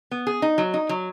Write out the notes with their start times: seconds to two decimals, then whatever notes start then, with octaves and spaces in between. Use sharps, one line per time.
0.11 B3
0.27 G#4
0.42 D#4
0.58 F#3
0.74 D#4
0.89 F#3